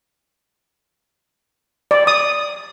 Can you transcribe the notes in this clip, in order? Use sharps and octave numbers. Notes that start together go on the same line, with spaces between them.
D5
D#6